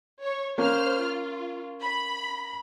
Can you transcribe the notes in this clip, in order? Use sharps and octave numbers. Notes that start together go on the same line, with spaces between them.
C#5
A#3 C#4 C5 F6
F4
B5